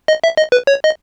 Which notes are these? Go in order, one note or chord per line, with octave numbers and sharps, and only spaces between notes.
D#5
E5
D#5
B4
C#5
D#5